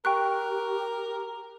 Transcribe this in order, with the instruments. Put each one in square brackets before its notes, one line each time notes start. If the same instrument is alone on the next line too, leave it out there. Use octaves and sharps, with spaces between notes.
[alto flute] G4 [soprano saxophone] A#4 [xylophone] G5 C#6 F#6